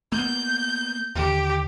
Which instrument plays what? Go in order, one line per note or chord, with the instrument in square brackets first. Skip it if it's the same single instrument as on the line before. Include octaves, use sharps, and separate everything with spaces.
[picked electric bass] A#3 B3 [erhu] G6
[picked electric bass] D#2 D3 [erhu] G4